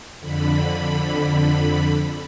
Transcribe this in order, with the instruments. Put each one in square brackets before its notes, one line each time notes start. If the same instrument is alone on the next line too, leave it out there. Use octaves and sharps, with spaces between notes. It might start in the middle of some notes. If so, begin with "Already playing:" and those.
[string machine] F2 D3 B5